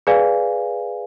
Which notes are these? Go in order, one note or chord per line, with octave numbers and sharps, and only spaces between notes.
G#4 B4 D5 F5 G#5